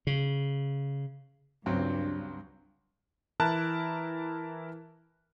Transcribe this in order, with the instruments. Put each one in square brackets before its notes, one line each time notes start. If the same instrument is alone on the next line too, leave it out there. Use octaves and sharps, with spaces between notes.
[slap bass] C#3
[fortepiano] C#2 F#3 C4 [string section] G2
[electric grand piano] E3 E4 A#4 A5 F#6